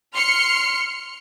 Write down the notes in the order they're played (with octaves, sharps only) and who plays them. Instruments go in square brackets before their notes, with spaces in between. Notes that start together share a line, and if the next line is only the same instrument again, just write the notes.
[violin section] C6 F6 C7 C#7